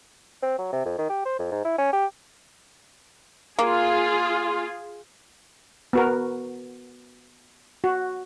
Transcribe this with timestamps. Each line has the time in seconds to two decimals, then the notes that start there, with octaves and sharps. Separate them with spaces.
0.43 C4
0.59 F#3
0.73 C3
0.85 F2
0.98 D#3
1.09 G4
1.25 C5
1.39 F2
1.52 G#2
1.65 E4
1.78 C#4
1.93 G4
3.59 A#3 F4 G#4
5.93 B3 F#4 A#4
7.84 F#4